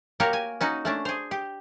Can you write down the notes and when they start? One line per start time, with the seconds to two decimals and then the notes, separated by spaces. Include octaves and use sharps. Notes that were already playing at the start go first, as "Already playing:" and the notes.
0.20 A#3 F#4 G4 A#4 C#5
0.33 G#5
0.61 C#4 D#4 F#4
0.85 A3 C#4 D4
1.05 G#4 C5
1.31 G4